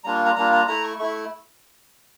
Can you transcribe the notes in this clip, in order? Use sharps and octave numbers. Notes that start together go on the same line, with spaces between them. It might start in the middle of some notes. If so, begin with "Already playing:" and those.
G3 A#3 D4 F4 A#5
C#6
A#5
G3 A#3 D4 F4 A#5
A#5
A3 E4 A#5
C#6
A3 E4 C#6